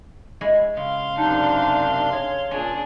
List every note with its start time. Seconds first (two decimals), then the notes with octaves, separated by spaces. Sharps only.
0.41 G#3 E4 C#5
0.77 C#3 F5 C6
1.17 F#2 C3 D4 D#4
2.13 G#4 C#5
2.51 A#2 C#4 D4 G#4